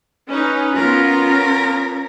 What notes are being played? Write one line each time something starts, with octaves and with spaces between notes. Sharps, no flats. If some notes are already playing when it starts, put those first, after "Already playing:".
C#4 D#4 B4
B3 C#4 F4 A#4